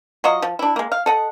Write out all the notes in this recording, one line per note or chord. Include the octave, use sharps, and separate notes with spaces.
F#3 F4 F#4 D#5
F3
D4 E4
G#3 A#3
F5
A4 D#5 F#5